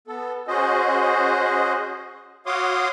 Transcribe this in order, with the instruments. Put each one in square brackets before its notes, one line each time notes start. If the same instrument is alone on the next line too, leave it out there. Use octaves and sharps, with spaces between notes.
[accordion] B3 A4
C#4 F#4 G#4 C5 D#5
F#4 C#5 F5 C6 D6 D#6